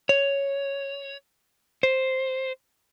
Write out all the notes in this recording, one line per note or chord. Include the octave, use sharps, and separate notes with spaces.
C#5
C5